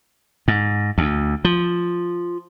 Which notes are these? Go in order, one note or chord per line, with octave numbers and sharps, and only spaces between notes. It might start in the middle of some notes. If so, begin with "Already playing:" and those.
G#2
D2
F3